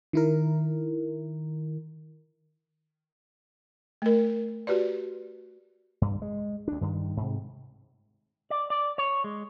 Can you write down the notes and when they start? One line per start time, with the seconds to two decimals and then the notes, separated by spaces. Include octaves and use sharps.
0.13 D#3 E4 A#4
4.02 A3 A#4
4.67 F#4 G4 B4 D5
6.01 G2
6.22 G#3
6.68 D2 D4
6.81 G2 D#3
7.17 G#2 C3
8.50 D5
8.70 D5
8.98 C#5
9.24 G#3